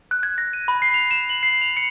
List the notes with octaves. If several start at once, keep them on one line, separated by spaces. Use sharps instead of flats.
F#6
G#6
A#6
D#7
B5
C7
F7
E7
F#7
C7
F7
C#7